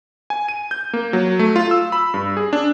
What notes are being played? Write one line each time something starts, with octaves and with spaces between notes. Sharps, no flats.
G#5
D#7
G6
A#3
F#3
A3
F4
E6
B5
G2
G#4
D4